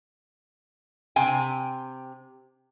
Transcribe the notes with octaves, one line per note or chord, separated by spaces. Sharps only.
C3 G5 G#5